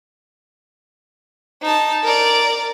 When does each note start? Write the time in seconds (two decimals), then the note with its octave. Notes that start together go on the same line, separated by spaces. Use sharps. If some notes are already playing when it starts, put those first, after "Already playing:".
1.63 D#4 A5
2.04 A#4 D5